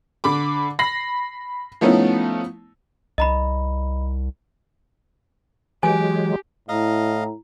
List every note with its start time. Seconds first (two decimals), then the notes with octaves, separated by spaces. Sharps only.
0.24 D3 B5 D6
0.79 B5 A#6 C7 F#7
1.81 F3 A3 B3 C#4 D#4 E4
3.18 C2 D#5 A#5 B5
5.83 E3 F#3 G#3 G4 G#5
6.69 A2 E4 D#5 F5 A#5